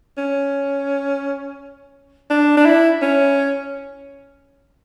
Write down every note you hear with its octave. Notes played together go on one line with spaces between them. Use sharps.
C#4
D4
D4
E4
C#4